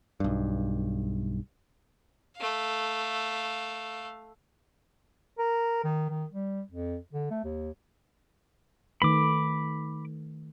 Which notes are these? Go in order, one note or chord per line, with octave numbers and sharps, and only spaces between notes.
B1 G2
A3 F5
A#4
D#3
D#3
G3
F2
D3
A3
D#2
D#3 A3 B4 B5 D6